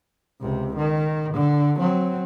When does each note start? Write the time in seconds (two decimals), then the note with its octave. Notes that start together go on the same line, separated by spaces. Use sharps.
0.41 C#2 C3
0.76 D#3
1.34 D3
1.78 F#3 C4